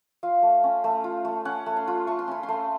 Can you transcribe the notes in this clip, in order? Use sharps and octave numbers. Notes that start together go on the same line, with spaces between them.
F4 F5
A3
C#4
A3
F4
A3
C#4 F#5
A3
C6
F4
A3 C#6
C6
C#4 B5
C6
A3